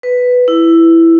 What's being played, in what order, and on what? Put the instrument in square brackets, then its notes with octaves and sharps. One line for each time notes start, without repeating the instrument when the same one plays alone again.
[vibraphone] B4
E4